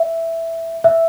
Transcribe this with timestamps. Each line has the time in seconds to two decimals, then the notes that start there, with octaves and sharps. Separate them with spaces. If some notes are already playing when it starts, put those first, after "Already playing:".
Already playing: E5
0.84 E5